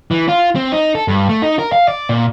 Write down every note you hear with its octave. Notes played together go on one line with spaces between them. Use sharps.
E3
F4
C4
D#4
A4
G2
A3
D#4
A#4
F5
D5
A#2